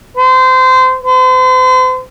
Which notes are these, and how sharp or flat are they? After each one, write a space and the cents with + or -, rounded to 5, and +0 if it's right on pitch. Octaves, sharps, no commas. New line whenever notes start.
C5 -25
C5 -40